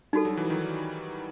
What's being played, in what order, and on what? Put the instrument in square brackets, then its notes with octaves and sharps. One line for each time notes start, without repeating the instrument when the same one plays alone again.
[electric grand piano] G3 [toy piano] D#4 F#4 A4
[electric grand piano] F#3
E3
D#3 F#3